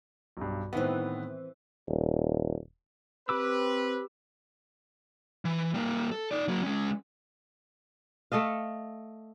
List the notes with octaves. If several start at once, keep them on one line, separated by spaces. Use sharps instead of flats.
B1 G2
A2 D#3 E3 B3 C4
D#1
C4 G4 B4 D6 E6
E3
G3 A#3
A4
D#4 D5
F#3 A#3
G#3 C#4
A3 A4 D#5 F5